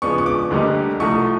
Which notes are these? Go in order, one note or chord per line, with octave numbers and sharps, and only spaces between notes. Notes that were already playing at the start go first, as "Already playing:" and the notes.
C#3 F3 G#3 B3 D4 C#6
C#6
D6
D2 D3 G3 A#3 D#4
C2 C3 F3 A3 C#6